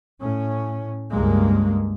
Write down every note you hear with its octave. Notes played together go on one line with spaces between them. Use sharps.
A2 C#4
C#2 G2 G#3 A#3